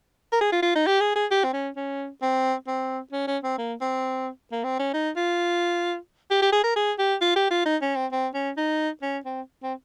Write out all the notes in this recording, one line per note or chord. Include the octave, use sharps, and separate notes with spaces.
A#4
G#4
F4
F4
D#4
G4
G#4
G#4
G4
C4
C#4
C#4
C4
C4
C#4
C#4
C4
A#3
C4
A#3
C4
C#4
D#4
F4
G4
G4
G#4
A#4
G#4
G4
F4
G4
F4
D#4
C#4
C4
C4
C#4
D#4
C#4
C4
C4